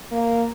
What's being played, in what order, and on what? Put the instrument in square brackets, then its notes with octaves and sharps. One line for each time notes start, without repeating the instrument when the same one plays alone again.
[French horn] A#3